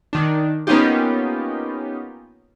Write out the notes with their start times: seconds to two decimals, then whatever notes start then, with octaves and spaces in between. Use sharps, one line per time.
0.13 D#3 D4
0.67 A#3 B3 C#4 D#4 F4 G4